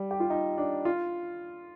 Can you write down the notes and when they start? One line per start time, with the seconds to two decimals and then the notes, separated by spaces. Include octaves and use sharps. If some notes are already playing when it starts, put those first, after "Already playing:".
Already playing: G3
0.11 G4
0.20 F4
0.30 D#4
0.58 D4
0.85 F4